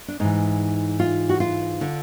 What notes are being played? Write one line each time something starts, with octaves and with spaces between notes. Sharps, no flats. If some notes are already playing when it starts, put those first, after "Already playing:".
D4
G#2 E3 D#4
F4
F#4
F4
D3